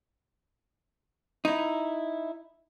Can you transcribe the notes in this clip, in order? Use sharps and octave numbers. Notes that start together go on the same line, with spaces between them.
D#4 E4